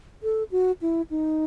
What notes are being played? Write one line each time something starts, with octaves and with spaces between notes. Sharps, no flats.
A4
F#4
E4
D#4